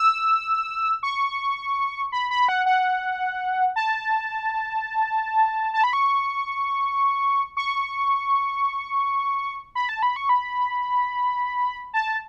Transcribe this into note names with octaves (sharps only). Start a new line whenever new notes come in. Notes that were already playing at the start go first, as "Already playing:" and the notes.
Already playing: E6
C#6
B5
B5
F#5
F#5
A5
A5
B5
C#6
C#6
B5
A5
B5
C#6
B5
A5